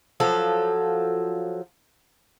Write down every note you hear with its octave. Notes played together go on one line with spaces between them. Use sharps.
F3 F#3 A4